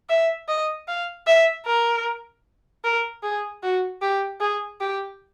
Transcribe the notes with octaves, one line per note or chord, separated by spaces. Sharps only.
E5
D#5
F5
E5
A#4
A#4
G#4
F#4
G4
G#4
G4